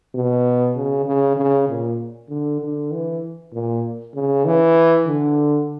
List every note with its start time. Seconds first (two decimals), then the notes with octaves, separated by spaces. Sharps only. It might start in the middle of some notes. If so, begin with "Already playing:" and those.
0.15 B2
0.76 C#3
1.06 C#3
1.37 C#3
1.68 A#2
2.29 D3
2.61 D3
2.92 E3
3.53 A#2
4.15 C#3
4.45 E3
5.06 D3